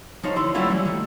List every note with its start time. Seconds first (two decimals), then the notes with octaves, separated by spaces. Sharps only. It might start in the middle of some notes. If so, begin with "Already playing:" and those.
0.23 F3 D#4 C5 C#5
0.36 D3 E4 C6
0.55 F#3 G3 A3 C#4 E4 F4
0.70 E3 F#3 G3
0.85 D#3 A3